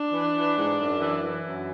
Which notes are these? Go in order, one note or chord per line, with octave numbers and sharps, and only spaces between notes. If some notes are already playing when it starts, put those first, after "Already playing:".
Already playing: D4
E3
E3
G#2
F#2
E3
E3
F#2